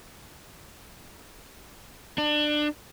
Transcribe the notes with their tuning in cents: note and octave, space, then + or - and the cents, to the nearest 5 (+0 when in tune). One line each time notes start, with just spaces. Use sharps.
D4 +25